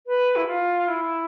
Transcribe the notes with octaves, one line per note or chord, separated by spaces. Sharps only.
B4
E4
F4
E4